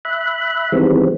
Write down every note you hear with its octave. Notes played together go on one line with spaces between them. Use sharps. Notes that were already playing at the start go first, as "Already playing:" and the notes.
E5 B5 F#6
D#3 E3 G3 G#3 B3 C4